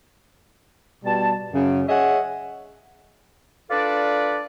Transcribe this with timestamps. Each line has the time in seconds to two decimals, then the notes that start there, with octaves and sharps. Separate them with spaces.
1.05 B2 G3 A5
1.52 F#2 C#3
1.89 G#4 C#5 D#5 E5 F#5
3.70 D4 F4 A4 B4 D5